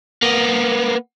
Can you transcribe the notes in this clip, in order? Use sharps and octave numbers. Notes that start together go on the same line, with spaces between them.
A#3 B3